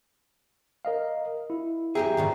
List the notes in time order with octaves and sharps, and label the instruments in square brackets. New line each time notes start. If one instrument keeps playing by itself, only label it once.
[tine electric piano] A#4 D#5 F5
E4
[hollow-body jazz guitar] F#2 G4 G#4 [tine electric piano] E5 G5 A#5
[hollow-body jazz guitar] D2 G#2 D#3